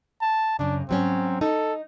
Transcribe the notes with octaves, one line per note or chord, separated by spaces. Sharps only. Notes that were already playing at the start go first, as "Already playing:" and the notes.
A5
F#2 C#3 D4
G#2 F#3 C4 C#4
D#4 A4